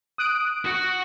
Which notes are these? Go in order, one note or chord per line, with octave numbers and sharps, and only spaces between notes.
D#6 F#6 D7
F#4 F#5